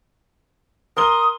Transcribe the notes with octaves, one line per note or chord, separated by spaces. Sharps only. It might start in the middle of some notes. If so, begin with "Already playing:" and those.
A#4 C6 D#6 G7